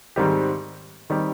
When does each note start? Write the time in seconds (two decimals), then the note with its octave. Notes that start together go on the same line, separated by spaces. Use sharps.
0.16 G#2 D#3 G3 C4 G4
1.10 D#3 G3 C4 G4